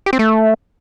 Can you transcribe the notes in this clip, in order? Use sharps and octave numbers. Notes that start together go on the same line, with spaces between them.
G4
C4
A3